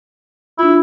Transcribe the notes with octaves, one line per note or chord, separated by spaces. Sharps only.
D4 E4 F4